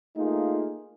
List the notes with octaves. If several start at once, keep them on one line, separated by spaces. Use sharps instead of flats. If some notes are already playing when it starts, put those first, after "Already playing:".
A3 A#3 D#4 F4 G#4